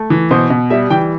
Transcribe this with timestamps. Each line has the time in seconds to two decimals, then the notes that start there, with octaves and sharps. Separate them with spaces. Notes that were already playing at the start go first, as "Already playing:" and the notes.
Already playing: A3
0.10 E3
0.31 B2 C5
0.50 B2
0.70 G3 E5
0.90 E3 G5